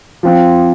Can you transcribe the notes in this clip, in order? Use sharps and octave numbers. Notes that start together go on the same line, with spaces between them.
F3 C4